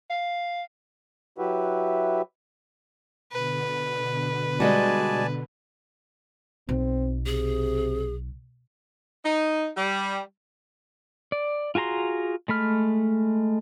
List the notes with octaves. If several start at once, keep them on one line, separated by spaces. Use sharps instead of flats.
F5
F#3 E4 F#4 G4 B4 E5
B2 D3 B4
G3 G#3 F#4 D5 G#5 A5
B1 C4
C3 G#4
D#4
G3
D5
F4 F#4 G#4 A#5 C6
G#3 A3 B5 F6